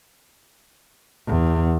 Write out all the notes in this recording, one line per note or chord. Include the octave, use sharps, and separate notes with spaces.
E2